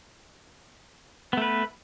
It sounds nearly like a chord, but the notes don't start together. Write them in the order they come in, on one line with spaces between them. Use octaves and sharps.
B3 A3 B4